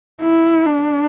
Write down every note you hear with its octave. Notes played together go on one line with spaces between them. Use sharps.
E4
D4